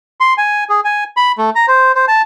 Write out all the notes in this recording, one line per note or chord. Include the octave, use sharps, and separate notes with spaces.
C6
G#5
G#4
G#5
B5
A3
A#5
C5
C5
A5